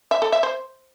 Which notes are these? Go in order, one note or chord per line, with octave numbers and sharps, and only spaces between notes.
E5
A4
E5
C5